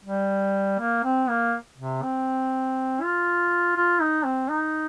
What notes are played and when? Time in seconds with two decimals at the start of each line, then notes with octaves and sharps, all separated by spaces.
0.05 G3
0.80 A#3
1.04 C4
1.29 A#3
1.78 C3
2.03 C4
3.02 F4
3.76 F4
4.01 D#4
4.25 C4
4.50 D#4